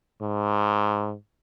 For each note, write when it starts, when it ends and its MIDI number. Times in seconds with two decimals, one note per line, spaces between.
0.22 1.15 44